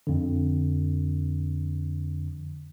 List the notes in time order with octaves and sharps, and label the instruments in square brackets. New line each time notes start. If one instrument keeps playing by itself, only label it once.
[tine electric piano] F2 D3